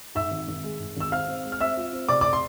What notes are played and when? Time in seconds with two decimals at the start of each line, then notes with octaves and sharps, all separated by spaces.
0.15 G#2 E5 E6
0.31 G#1
0.48 G#1
0.64 G#3
0.79 G#2
0.97 G#1 E6
1.12 C4 F5 F6
1.28 C4
1.45 G#3
1.52 F6
1.60 C4 E5 E6
1.77 F4
1.93 C4
2.09 C3 D5 D6
2.21 D5 D6
2.33 C6